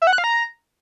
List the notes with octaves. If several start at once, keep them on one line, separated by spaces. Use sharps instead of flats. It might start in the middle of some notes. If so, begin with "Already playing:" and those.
E5
F#5
F#6
F5
A#5